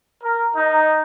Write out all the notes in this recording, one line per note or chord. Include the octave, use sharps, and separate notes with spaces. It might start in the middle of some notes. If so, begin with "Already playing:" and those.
A#4
D#4